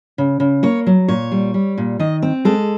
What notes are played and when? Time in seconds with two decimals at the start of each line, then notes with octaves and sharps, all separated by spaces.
0.18 C#3
0.40 C#3
0.63 A#3 C#5
0.87 F#3
1.08 A#2 C#5
1.31 G3
1.54 G3
1.78 A#2
1.99 D#3 D#5
2.22 C4
2.45 G#3 A4